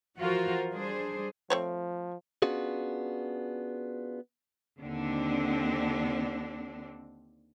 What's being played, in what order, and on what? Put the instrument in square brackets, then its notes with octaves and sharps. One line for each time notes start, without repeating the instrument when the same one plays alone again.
[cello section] E3 F3 F4 F#4 A#4 C5
G3 D4 G#4 C5
[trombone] F3 [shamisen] A3 C4 C#5
[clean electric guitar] B3 C#4 D4 F4 F#4 G#4
[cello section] D#2 D3 C4 D4